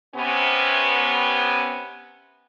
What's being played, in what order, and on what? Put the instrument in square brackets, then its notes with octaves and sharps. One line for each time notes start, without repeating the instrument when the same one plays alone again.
[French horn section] C3 B3 C#4